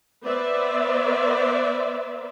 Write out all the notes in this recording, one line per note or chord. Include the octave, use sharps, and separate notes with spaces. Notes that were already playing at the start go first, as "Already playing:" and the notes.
B3 B4 C5 D5 E5